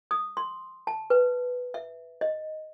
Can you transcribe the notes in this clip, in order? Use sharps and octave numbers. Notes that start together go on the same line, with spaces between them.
D#6
C6
A5
B4
E5
D#5